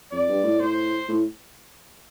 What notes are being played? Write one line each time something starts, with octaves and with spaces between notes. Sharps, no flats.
F2 D5
G2
A2
A2 C5
A2